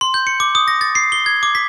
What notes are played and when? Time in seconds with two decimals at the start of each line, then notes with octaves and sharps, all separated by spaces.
0.01 C6
0.14 G6
0.27 C#7
0.40 D6
0.55 D#6
0.68 A#6
0.81 A6
0.95 C7
1.12 G7
1.26 G#6
1.43 D6
1.55 B6